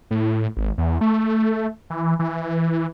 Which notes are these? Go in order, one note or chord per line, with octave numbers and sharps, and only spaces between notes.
A2
G#1
E2
A3
E3
E3